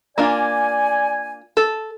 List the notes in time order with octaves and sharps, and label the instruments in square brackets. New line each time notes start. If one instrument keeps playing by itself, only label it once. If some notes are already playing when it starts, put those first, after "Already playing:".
[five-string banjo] A#3 D4 F4 [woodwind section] D5 G#5
[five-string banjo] A4